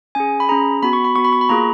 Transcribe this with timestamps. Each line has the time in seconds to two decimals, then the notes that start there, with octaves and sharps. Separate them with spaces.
0.15 C#4 G#4 G#5
0.40 B5
0.49 C#4 G#4 A#5
0.83 B3 F#4 B5
0.93 C#6
1.05 B5
1.16 B3 F#4 C#6
1.24 B5
1.33 C#6
1.41 B5
1.49 A#3 F4 G#4 A#5